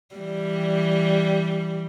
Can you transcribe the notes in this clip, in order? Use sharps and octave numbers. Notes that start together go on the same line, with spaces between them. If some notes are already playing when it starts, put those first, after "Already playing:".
E3 G3